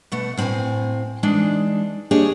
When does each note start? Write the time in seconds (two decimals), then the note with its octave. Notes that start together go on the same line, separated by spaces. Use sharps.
0.12 B2 A3 F#5
0.37 A2 C4 A4 F5 G#5
1.23 E3 G#3 D4 D#4
2.11 A#3 D4 G4 G#4 C#5 D#5